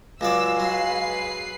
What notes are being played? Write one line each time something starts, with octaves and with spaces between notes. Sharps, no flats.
C#2 F#3 G#3 D5 F5 E6
F#3 B4 C7